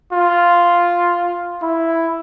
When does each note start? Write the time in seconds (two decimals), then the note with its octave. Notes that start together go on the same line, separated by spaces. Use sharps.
0.13 F4
1.62 E4